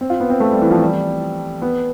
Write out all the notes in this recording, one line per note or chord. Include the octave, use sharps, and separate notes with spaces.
C4
F4
B3
C4
A3
G3
E3
F3
G3
B3